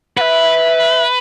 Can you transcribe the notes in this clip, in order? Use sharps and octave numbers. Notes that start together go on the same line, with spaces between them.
B4 E5 F#5